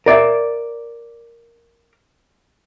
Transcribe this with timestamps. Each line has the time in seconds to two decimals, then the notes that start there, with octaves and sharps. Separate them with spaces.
0.06 A#4 D5 E5